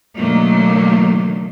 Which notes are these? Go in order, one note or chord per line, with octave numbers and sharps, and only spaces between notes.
B2 D3 D#3 F#3 A3 A#3